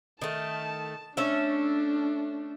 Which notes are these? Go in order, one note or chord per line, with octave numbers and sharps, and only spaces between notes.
D#3 A3 A5
A3 C#4 D4 E5